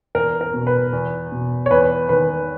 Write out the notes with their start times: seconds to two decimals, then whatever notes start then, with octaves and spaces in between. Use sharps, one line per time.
0.15 E2 A#4
0.41 A#4
0.54 B2
0.67 B4
0.93 E2
1.32 B2
1.66 C#5
1.71 E2 B4
2.09 D#3 B4